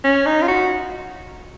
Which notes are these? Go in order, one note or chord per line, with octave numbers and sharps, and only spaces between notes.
C#4
D#4
F4
F#4